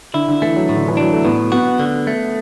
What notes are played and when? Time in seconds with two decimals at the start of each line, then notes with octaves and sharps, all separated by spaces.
0.14 D3 E4
0.28 D3
0.42 E3 A3
0.56 F#3
0.69 A2
0.77 D3
0.88 E3
0.97 F#3 D4
1.13 A3
1.25 A2 B3
1.52 B3 F#4
1.80 D3
2.07 A3